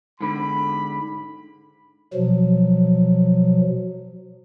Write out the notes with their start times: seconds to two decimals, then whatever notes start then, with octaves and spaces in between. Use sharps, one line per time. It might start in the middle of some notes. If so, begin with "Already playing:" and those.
0.21 G#2 D3 B5
2.14 B2 F3 F#3